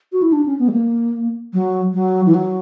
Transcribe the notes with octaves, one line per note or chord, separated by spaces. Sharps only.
F#4
E4
D4
C#4
B3
G3
A#3
F#3
F#3
E3
F#3